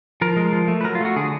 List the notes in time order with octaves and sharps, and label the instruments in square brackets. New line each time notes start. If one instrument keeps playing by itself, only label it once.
[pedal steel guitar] F3 A#4
G#3
F3
A3
B4
F#3 A#4
F4
A3 F#4
D3 G#4